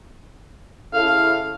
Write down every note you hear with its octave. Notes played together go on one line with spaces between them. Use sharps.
C#3 E4 A4 F5